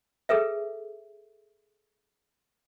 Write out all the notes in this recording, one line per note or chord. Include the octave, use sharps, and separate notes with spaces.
G#4 A4 B4 E5